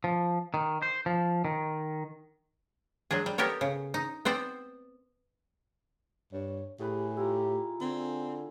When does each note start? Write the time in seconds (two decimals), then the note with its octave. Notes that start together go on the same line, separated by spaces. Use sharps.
0.04 F3
0.54 D#3
0.82 C5
1.06 F3
1.45 D#3
3.11 F#3 G#3 D4 G#4
3.26 G3
3.38 B3 G4 A4 A#4 C#5
3.61 C#3
3.94 D#4
4.25 B3 C4 C5 D5
6.33 G2 C#5
6.80 A2 G4 G#4 B4 B5
7.17 E4 F4 G4 A#5
7.81 D3 C4 G#5